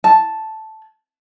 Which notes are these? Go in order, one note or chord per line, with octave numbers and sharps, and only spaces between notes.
A5